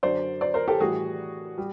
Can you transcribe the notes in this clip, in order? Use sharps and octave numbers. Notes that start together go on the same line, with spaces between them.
F#2 D3 F#3 C5 D5
C5 D5
A#4 C5
G4 A4
A2 E3 G3 F#4 G#4
G3